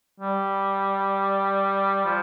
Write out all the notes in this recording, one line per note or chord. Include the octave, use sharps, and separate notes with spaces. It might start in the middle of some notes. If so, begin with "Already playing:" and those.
G3
F3